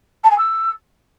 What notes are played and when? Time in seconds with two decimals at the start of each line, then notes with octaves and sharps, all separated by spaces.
0.23 A5
0.31 G#5
0.38 E6